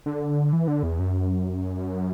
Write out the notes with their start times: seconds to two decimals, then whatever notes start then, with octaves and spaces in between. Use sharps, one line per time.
0.06 D3
0.53 E3
0.68 D3
0.83 E2
0.99 F#2